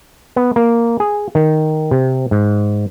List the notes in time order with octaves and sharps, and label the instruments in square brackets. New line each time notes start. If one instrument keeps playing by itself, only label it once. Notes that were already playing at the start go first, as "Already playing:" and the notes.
[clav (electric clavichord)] B3
A#3
G#4
D#3
C3
G#2